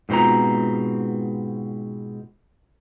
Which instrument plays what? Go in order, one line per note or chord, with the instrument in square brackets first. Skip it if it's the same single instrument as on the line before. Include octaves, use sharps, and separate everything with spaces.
[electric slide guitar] G#2 B2 C4 F4 A#5